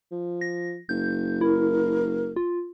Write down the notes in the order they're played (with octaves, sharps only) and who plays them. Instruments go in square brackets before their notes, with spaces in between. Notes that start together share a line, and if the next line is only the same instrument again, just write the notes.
[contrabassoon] F3
[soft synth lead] A#6
[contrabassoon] F#1 [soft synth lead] G6
[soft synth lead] E4 [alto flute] A#4
[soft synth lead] F4